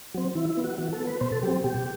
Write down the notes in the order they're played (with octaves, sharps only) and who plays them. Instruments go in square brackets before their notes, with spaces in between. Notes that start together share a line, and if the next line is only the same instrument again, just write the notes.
[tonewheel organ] F#3 C4
E3 E4
E4
B3
F#4
E3 F#4
A4
B3
B4
B2 C5
A4
F#3 C4 G4
B2 G4